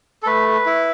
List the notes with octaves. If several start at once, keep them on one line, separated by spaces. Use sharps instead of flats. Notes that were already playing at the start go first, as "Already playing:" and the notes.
A4
A3 B4
E4